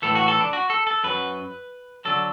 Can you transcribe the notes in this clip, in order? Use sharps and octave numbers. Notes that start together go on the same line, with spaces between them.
A2 E3 A4
F#4
A4
D4
F#4
A4
A4
F#2 F#3 B4
D3 F#3 A4